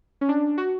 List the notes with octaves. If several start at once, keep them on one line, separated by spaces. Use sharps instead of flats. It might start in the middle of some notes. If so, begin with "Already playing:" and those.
C#4
D4
F#4